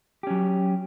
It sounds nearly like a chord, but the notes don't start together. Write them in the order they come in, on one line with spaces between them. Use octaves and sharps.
G4 C#4 F#3